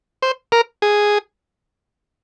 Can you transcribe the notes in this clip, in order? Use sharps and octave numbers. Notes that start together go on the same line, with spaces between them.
C5
A#4
G#4